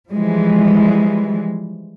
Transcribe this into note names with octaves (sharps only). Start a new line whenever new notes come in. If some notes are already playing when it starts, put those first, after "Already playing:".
E3 F3 G3 G#3